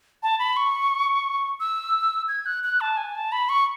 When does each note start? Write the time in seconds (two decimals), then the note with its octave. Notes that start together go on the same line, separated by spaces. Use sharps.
0.23 A5
0.39 B5
0.57 C#6
1.60 E6
2.28 G#6
2.46 F#6
2.64 F#6
2.81 A5
2.97 G#5
3.15 A5
3.32 B5
3.49 C#6